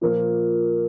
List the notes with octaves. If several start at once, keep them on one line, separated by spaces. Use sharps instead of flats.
A#2 F3 A#3